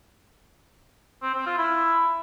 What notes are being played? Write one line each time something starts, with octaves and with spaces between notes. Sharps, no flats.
C4
C4
F4
E4